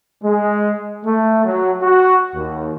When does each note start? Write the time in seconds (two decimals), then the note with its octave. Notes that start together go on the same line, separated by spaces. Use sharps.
0.24 G#3
1.04 A3
1.45 F#3
1.81 F#4
2.34 D#2